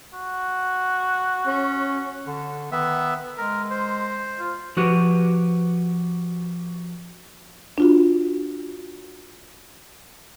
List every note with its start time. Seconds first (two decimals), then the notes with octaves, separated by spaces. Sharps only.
0.14 F#4
1.46 C#4
2.27 D3
2.72 D#3 B3 E5
3.38 G#3 A#4
3.70 C5
4.39 F4
4.77 F3 F#4 G4 B4
7.78 D4 F4 F#4